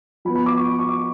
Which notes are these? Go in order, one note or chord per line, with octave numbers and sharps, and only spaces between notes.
F3 B3 B5
B5
D6
C#6
B5
C#6
D6